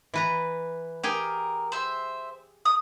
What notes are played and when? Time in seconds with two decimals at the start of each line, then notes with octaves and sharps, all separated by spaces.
0.14 E3 B4 A#5
1.04 G4 G#4 A#4 G5
1.72 C5 E5
2.65 D#6